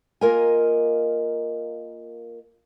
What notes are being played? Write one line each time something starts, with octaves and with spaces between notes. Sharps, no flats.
A#3 F4 A#4 D#5 G#5